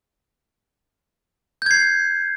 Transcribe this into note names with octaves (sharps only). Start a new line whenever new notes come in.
G6 G#6 C7